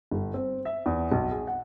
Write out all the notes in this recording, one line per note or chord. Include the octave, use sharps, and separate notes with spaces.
G1
C4
E5
E2
B1
G#4
F#5